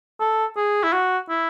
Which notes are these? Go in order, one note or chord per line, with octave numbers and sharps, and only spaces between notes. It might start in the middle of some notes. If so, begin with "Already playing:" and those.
A4
G#4
E4
F#4
E4